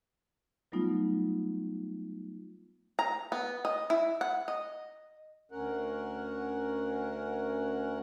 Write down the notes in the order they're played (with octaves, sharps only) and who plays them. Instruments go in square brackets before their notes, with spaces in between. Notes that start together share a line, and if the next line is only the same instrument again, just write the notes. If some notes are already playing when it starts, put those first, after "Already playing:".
[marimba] F#3 G3 A3 B3 D#4 F4
[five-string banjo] A#5
B3
D#5
E4
F#5
D#5
[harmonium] D2 C#4 A#4 F#5